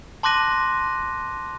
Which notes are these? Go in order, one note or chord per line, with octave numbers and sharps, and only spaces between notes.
A5 C6 D6 F#6 A#6 D#7